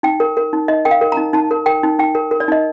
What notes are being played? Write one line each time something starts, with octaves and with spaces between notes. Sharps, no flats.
D#4 G5
A#4
A#4
D#4
D#4 D#5
A#4 G5
F5
A#4
D#4 A#5
D#4 A5
A#4
A#4 G5
D#4
D#4 G5
A#4
A#4
D5
D#4 D#5